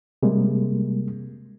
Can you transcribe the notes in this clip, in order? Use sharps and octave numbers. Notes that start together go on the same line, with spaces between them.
C3 G3 G#3 A#3